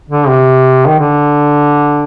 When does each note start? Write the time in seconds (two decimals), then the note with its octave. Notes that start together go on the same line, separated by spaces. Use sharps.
0.10 D3
0.28 C3
0.87 D#3
0.99 D3